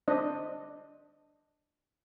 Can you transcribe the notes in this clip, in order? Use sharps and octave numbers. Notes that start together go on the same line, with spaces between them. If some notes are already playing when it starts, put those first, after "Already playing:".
D4 C5 D#5